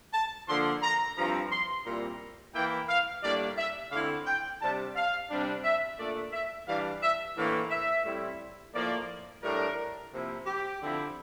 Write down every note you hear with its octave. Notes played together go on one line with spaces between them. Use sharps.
A5
D3 F3 A#3 D4 C6
A#5
G2 F3 C4 E4 A#5
C6
A#2 G3 C4 E4 A#5
E3 A#3 E4 G5
F5
A2 G3 A#3 D4 D5
E5
D3 A3 C4 E4 F5
G5
C3 G3 D4 A5
F5
C3 G3 D4
E5
A#2 A3 D4 D5
E5
E3 G3 D4 F5
E5
A2 E3 A#3 D4 F5
E5
A2 G3 C4 E4
A2 F3 A#3 D5
A2 G3 D4 A#4
C3 F3 A#3 E4
G4
D3 F3 C4 E4